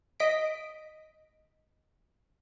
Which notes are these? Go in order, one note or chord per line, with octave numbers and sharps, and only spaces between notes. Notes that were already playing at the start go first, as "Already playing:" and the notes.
D#5 B6 D7